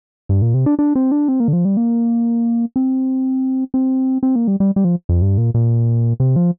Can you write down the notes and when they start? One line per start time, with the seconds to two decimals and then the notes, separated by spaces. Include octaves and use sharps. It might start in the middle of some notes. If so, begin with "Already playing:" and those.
0.29 G2
0.42 A#2
0.54 C3
0.66 D4
0.79 D4
0.95 C4
1.12 D4
1.28 C4
1.40 A#3
1.48 D3
1.53 F3
1.65 G3
1.77 A#3
2.76 C4
3.74 C4
4.23 C4
4.36 A#3
4.48 G3
4.60 G3
4.76 G3
4.84 F3
5.09 F2
5.22 G2
5.38 A#2
5.54 A#2
6.20 C3
6.36 F3